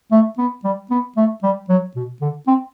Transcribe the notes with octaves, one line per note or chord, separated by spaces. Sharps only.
A3
B3
G3
B3
A3
G3
F#3
B2
D3
C4